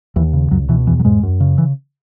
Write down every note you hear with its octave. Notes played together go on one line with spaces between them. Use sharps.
D#2 E3
C#3
C#2 F#2 F#3
B2 E3
E2 E3
F#3
E2 G#2 G#3
F#2
C#3
E3